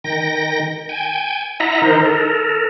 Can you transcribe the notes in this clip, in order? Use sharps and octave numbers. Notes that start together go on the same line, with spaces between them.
D#3 G5 A#6
G5 G#5
E4 D#5 E5 F#5 A#5
D#3 D#4 A#4 C5
A4 A#4